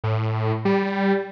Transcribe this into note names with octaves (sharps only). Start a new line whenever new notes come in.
A2
G3